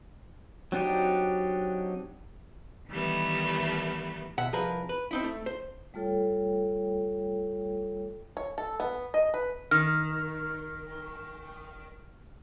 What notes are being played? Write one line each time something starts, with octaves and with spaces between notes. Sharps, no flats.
F#3 C4 D4 D#4 G4
D#3 E3 G3 A3 B3
B2 E5 F#5
C2 F3 G#4 A#4 B4
B4
C4 D#4 E4
A3
C5
G3 A3 F4 A4 C#5 G5
C#5
A4
B3
D#5
B4
D#3 F6